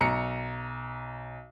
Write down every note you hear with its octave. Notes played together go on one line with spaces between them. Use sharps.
B1 A#5 C#7